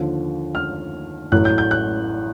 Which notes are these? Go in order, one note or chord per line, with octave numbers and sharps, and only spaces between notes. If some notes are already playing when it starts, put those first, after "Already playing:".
Already playing: D#2 D3 F3
F6
A1 A2 F#3 A3 F#6
G6
G6
F#6